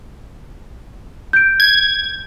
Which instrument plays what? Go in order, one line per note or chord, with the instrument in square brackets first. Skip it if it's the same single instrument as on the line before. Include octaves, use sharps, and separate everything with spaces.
[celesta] G6 D7
[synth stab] G#6